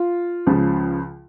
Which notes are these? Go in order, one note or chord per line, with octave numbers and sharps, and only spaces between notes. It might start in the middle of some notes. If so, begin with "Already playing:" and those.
Already playing: F4
C#2 C#3 F3